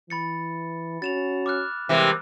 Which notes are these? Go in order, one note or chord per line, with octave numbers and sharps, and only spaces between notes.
E3 B5 A6 C#7
C#4 F#4 A6 E7 F7
D6 F6 F#6
C3 E3 G3 G#3 A#3